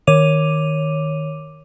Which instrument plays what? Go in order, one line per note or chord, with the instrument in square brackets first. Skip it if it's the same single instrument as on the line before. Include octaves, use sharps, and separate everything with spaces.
[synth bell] D#3 C#5 D6 D#7 F7